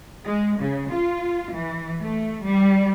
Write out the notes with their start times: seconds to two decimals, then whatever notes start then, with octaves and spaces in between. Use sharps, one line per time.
0.25 G#3
0.61 C#3
0.92 F4
1.53 E3
2.01 A3
2.45 G3